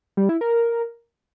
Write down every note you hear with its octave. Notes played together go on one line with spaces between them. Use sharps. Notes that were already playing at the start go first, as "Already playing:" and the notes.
G3
E4
A#4